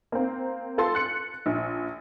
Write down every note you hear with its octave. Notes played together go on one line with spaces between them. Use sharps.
A#3 C4
F4 A4 C6 A6
F#6 C#7
A#1